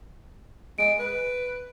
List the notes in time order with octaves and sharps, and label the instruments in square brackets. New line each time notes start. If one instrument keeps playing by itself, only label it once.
[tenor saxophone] G#3 [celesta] D7
[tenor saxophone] B4